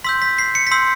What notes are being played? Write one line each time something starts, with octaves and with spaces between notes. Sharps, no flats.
C6 E6 G6 B6
B6
C7
C#7
B6
C6 E6 G6 C7